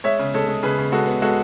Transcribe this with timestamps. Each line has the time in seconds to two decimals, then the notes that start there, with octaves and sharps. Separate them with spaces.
0.04 G#3 C#5 E5
0.19 C#3
0.34 G#3 A4 C#5
0.48 G#3
0.63 C#3 G#4 B4
0.78 C#3
0.92 G#3 F#4 A4
1.07 B3
1.22 G#3 F#4 A4